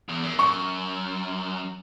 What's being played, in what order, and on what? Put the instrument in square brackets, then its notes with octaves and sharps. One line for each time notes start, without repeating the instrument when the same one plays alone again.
[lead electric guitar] E2
F#2
[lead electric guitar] F#2 [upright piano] C#6